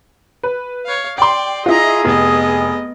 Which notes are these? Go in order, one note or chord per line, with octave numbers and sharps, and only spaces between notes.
B4
C#5 F5
D5 G5 C6
E4 F4 G#4 D#5 A#5
F1 B3 D#5